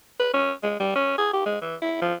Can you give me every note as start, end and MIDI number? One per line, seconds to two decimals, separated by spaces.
0.20 0.33 71
0.34 0.52 61
0.63 0.76 56
0.80 0.92 55
0.95 1.17 61
1.18 1.30 68
1.33 1.44 67
1.46 1.59 56
1.61 1.76 52
1.82 2.01 64
2.01 2.14 53